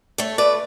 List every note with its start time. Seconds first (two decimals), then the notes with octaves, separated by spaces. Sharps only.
0.18 A3 A4 C#5
0.38 A3 B4 D5